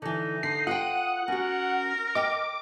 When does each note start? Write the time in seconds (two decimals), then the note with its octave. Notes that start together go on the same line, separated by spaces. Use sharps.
0.02 D3 E3 D#4
0.43 D3 C7
0.67 F4 D5 F#5 G5 D#6
1.28 C#4 F#4 A#4
2.15 D#5 G5 D6